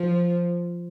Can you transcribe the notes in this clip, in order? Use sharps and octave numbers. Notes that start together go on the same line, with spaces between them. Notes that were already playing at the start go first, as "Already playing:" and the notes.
Already playing: F3